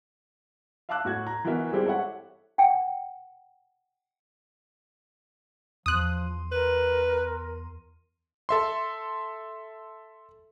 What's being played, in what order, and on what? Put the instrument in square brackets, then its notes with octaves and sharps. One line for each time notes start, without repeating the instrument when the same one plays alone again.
[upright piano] E5 F5 A5 D6 E6 F#6
A2 F#4 G#6
A#5
E3 B3 F#4 A#4 E5
G3 G#3 C4 E4 G4
G4 A4 C#5 E5 F#5
[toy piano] F#5 G5
[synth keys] E2 C6 D#7 [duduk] F3 [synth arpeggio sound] D#6 F#6
[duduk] A#4 [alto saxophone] B4
[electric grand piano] A4 E5 C6